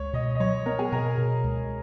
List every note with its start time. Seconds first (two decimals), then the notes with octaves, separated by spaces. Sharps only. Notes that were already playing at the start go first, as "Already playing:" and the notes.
Already playing: C#2 C#5
0.13 B2 D#5
0.35 D#5
0.40 F#3 C#5
0.66 B3 A#4
0.79 G#4
0.92 B2 A#4
1.18 B2
1.44 C#2